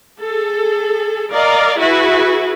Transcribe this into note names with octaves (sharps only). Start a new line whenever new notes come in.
G#4 A4
A#4 D5 D#5 F5
E4 F#4 G#4 B4